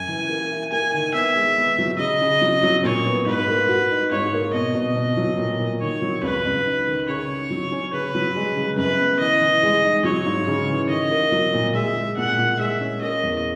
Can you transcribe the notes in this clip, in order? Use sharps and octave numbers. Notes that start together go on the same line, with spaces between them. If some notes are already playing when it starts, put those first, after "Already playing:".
Already playing: F#2 G#5
E3
A#3
E4
A#3 G#5
D#3
B3 E5
G#3
B3
F#3
C#3 D#5
C#3
F#3
F#3
A#2 C#5
B3
G#2 B4
A#3
F#4
D#4
G#2 C#5
A#3
B2 D#5
B2
B2
F#3
A#2
A#2
D#3 C#5
F#3
C#2 B4
C#2
D#4
D#3
C#3 C#5
D#4
F#3
C#4
C#3 B4
F#3
G#3
C#3
F#2 B4
B3
E3 D#5
E3
G#3
D#4
F#3 C#5
G#2
C#3
E3
D#3 D#5
A#3
F#3
A#2
G#3 E5
G#3
A#2 F#5
A#2
G#3 E5
C#4
A#3 D#5
E2